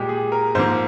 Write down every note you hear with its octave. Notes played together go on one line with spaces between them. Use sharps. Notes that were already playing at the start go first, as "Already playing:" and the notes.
Already playing: A#2 G#3 G4
G#4
A#4
G#2 F3 A#3 C5